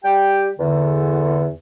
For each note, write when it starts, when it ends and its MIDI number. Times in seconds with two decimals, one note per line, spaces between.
0.04 0.49 55
0.04 0.49 67
0.04 0.49 79
0.59 1.49 40
0.59 1.49 50